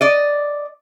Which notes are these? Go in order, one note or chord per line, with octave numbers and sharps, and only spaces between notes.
D5 D#5